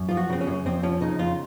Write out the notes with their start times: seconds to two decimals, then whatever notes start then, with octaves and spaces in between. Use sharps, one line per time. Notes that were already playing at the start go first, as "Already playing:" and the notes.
Already playing: F#2
0.09 F3 F4
0.17 F#4
0.30 C#3 C4
0.41 C#4
0.47 F#2
0.66 F2 C4
0.83 F3 C#4
1.01 C#3 D#4
1.19 F2 F4